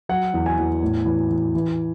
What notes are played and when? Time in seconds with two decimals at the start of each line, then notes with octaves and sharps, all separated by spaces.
0.09 F#3 F#5
0.34 E2
0.46 G#5
0.58 E2
0.83 A2
1.05 E3
1.30 E3
1.55 E3